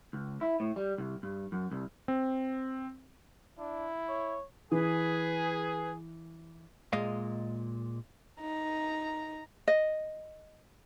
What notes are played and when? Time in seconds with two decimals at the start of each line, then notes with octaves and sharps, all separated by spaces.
0.13 C#2
0.41 E4
0.60 A2
0.76 G3
0.98 C2
1.23 G2
1.52 F#2
1.71 C2
2.08 C4
3.59 D4 E4
4.09 C#5
4.72 E3 G#4 B4
6.93 A#2 G#3 D#5 F5
8.40 D#4 A#5
9.68 D#5